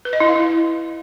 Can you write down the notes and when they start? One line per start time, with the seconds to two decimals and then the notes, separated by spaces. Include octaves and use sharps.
0.05 B4
0.13 D#5
0.20 E4
0.28 F5
0.36 E4